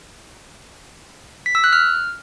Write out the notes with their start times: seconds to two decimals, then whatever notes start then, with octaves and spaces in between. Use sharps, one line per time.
1.46 B6
1.55 E6
1.64 F#6
1.73 F6